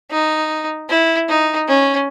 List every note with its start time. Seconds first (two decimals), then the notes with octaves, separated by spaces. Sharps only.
0.11 D#4
0.89 E4
1.29 D#4
1.68 C#4